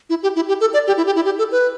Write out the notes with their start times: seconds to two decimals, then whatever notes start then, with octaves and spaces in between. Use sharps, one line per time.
0.10 E4
0.23 G4
0.36 E4
0.48 G4
0.61 A4
0.73 D5
0.87 G4
0.97 E4
1.06 G4
1.16 E4
1.25 G4
1.38 A4
1.52 B4